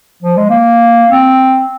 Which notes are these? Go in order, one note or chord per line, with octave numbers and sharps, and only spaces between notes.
F3
G#3
A#3
C4